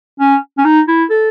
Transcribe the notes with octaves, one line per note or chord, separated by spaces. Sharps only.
C#4
C#4
D#4
E4
A4